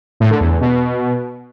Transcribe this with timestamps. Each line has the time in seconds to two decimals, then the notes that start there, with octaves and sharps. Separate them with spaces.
0.20 A2
0.30 D3
0.40 E2
0.51 E2
0.61 B2